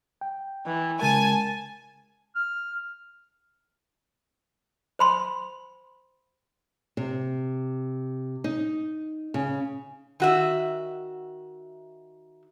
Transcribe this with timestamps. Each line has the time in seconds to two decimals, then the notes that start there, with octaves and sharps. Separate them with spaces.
0.21 G5
0.66 E3
1.01 C#3 G#3 A#4 G#5 A5
2.35 F6
4.99 C5 B5 C6
6.97 C3
8.44 D#4
9.34 C#3
10.20 D#3 F#4 E5